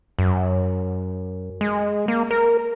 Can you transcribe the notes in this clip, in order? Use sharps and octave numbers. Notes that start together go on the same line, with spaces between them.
F#2
G#3
A#3
A#4